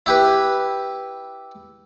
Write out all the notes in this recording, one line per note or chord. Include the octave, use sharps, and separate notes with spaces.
E4 G4 B4